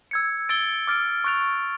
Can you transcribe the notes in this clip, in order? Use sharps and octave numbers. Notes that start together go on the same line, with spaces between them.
E6 G#6 C#7
E6 A6 D7 G7
D6 F6 A6 D7
C#6 F#6 A6 D7 F7